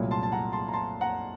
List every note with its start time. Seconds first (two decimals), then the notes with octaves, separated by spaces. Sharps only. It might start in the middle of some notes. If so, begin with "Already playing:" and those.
Already playing: C2 A#2 F#3 A3
0.11 A5 C6
0.23 A5
0.32 F#5 A#5
0.52 A5 C6
0.68 A#5
0.73 A5 C6
1.01 F#5 A#5